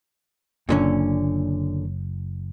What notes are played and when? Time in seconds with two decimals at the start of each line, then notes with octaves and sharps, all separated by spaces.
0.69 F#1 A#2 D3 C#4